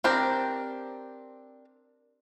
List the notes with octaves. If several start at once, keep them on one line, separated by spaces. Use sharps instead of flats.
C4 D4 G4 A#4